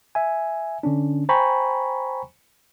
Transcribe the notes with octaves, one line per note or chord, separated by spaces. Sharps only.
E5 G#5
D3 C#4 D4
C5 G5 G#5 A#5 B5 C#6